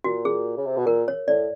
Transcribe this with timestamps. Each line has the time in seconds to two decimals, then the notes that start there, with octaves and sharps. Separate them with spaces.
0.04 A#2 F#4
0.25 G#4
0.57 C#3
0.67 C3
0.77 B2
0.86 A#2 A#4
1.08 C#5
1.28 A2 D5